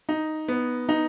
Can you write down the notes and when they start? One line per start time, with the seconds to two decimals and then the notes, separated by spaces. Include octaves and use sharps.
0.09 D#4
0.48 B3
0.89 D#4